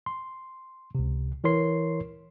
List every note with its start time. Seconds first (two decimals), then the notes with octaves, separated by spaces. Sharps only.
0.06 C6
0.95 C#2 C3
1.44 E3 E4 A#4 C#5 C6 C7